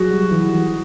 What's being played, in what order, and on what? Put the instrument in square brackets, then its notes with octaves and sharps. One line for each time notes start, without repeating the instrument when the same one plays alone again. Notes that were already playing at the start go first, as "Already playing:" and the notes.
Already playing: [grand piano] F#3 F#4 G#4
G3
E3
E3